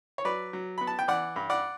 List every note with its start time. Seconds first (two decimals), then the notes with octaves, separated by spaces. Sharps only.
0.18 C#5
0.25 F#3 B4 D5
0.53 F#3
0.78 B3 B5
0.87 A5
0.99 G5
1.08 E3 D5 F#5
1.36 G2
1.50 D5 F#5